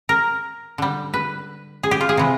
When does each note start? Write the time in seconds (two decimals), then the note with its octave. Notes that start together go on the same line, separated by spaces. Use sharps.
0.09 A#4
0.78 D3 G3
1.14 B4
1.83 G#4
1.91 G4
2.01 F4
2.09 G#4
2.17 C3 E3 G#3